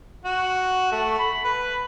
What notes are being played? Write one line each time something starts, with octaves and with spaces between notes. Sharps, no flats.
F#4
A3
B5
B4